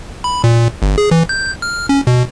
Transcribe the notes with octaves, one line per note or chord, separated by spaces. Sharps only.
B5
A#2
G1
G#4
E3
G6
F6
C#4
B2